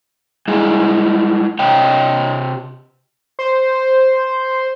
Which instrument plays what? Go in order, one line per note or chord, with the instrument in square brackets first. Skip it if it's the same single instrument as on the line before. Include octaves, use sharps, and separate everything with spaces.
[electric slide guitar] G3 G#3 E4 G#4 D#5
C3 C#5 D#5 G5
[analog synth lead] C5